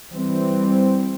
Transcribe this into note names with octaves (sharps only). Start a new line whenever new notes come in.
E3 G3 C4